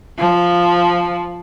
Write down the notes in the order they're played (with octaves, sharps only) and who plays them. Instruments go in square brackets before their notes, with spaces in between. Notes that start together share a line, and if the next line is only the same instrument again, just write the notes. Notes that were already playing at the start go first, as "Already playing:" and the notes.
[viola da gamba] F3